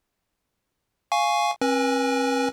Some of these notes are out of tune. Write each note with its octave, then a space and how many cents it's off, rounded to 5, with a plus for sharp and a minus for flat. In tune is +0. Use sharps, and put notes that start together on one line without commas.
F5 +0 G#5 +0 C#6 +0
C4 +45 B4 -35 G#5 +0